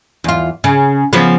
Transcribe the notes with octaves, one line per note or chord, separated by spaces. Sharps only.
E2 F4
C#3
C#3 F3 B3